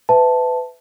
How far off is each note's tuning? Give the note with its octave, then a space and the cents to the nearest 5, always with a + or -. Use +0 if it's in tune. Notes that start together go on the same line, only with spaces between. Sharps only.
B4 +25 E5 +0 A5 +0